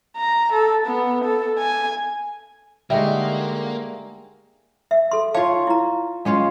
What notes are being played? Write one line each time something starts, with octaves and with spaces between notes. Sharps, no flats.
A#5
A4
B3
A4
G#5
D3 G3 G#3 A#3 D#4 F#4 E5
E5
A4 C6
F4 C#5 F5 A5
E4 A#5
G#3 C#4 F4